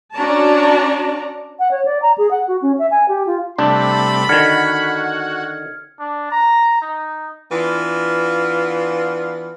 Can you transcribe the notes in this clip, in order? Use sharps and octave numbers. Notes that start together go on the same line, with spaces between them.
C#4 D4 F#4 D5 A5 A#5
F#5
C#5
D5
A#5
G#4
F#5
F#4
C#4
E5
G#5
G4
F4
C3 G3 A3 D4 B5
D3 D#3 F#4 F6 G#6 C#7
D4
A#5
D#4
E3 B3 D4 F4